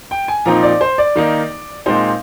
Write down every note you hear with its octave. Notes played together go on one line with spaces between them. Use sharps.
G5
G#5
A#2 F3 C4 D#4 A#5
D5
C5
D5
D#3 A#3 D#4
A#2 G#3 C4 D#4 C5